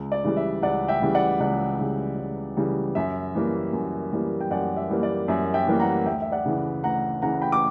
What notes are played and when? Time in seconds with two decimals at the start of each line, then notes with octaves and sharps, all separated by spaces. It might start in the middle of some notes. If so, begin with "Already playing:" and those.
Already playing: C#2
0.12 D5
0.24 C#3 E3 G3
0.37 E5
0.63 C#2 D5 F#5
0.88 E5 G5
1.02 C#3 E3 G3
1.15 D5 F#5
1.40 C#2 D5 F#5
1.79 C#3 E3 G3
2.18 C#2
2.57 C#3 E3 G3
2.95 F#2 E5
3.35 E3 G3 A#3
3.73 F#2
4.13 E3 G3 A#3
4.41 G5
4.51 F#2 D5 F#5
4.77 E5
4.90 E3 G3 A#3
5.03 D5
5.28 F#2 E5
5.54 E5 G5
5.68 E3 G3 A#3
5.80 F#5 A#5
6.06 D2 E5 G5
6.22 E5
6.32 D5 F#5
6.46 C#3 E3
6.84 D2 F#5 A#5
7.22 C#3 E3 F#5 A#5
7.41 G5 B5
7.52 D6